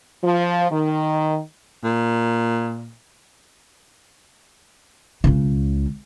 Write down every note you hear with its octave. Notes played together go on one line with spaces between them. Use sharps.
F3
D#3
A#2
C#2 C#3